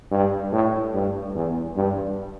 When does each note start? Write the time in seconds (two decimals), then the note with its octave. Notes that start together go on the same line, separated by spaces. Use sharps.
0.11 G2
0.52 A2
0.94 G2
1.35 E2
1.76 G2